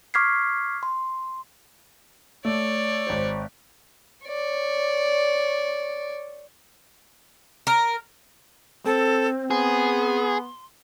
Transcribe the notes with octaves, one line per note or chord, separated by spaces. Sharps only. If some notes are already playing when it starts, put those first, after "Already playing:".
C#6 D6 F6 G#6 B6 C7
C6
A3 C#5 D5
G#1 C5
C#5 D5
A#4
C4 A4
B3 G#4 C6